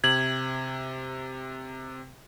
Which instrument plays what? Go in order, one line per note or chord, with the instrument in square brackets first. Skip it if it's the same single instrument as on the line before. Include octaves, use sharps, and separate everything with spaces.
[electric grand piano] C3 [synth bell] G#6 F#7